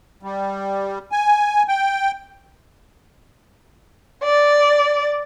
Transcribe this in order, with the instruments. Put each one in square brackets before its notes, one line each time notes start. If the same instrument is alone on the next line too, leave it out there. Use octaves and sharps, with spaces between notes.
[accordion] G3
G#5
G5
[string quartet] D5